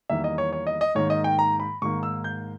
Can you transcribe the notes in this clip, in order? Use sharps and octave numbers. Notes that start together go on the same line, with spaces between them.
E2 D#3 G3 A#3 E5
D#5
C#5
C#5
D#5
D#5
G#2 D#3 A#3 C#5
D#5
G5
A#5
B5
G#2 D#3 A#3 C#6
E6
G6